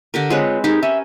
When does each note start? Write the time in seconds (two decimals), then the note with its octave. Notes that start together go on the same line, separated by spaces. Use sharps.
0.14 D3 G4 A#4
0.30 G#3 C4 F4 B4 C#5
0.64 D#4 G4 G#4 A#4
0.83 C#4 E5